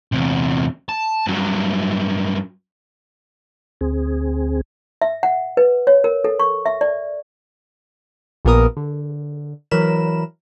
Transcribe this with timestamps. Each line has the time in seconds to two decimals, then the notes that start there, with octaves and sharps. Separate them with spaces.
0.12 E2 C3
0.89 A5
1.27 G2 F#3
3.81 D2 C4 G#4
5.02 E5
5.23 F#5
5.57 B4
5.87 C#5
6.04 A#4
6.24 A4
6.39 C#6
6.66 E5
6.81 D5
8.45 A#1 A#2 B3 A#4 D#6
8.77 D3
9.71 E3 F#3 A#4 B5 E7